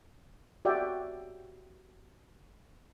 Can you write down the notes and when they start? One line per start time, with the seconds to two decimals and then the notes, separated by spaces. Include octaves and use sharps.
0.65 F#4 G4 D5 E5 G5